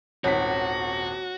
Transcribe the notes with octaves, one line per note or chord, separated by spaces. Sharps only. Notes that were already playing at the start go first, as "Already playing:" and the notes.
D#1 G#1 F#4 C#5 B6